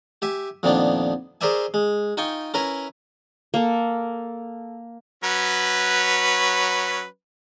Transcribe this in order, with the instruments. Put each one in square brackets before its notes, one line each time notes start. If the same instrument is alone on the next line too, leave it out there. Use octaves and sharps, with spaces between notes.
[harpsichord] G4 E5 G#5
F2 A#2 D#3 F3 B3 D4
G#4 A#4 C5 D5 E5 G#5
G#3
D#4 F4 G5 G#5 C#6
C#4 E4 A#4 B4 G#5 A#5
[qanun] A#3 A4
[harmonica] F#3 C#4 B4